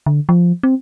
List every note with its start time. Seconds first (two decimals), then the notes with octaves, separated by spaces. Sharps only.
0.06 D3
0.29 F3
0.63 C4